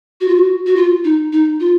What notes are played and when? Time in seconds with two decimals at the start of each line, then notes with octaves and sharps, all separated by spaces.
0.21 F#4
0.28 F4
0.36 F#4
0.66 F#4
0.76 F4
1.04 D#4
1.32 D#4
1.60 F4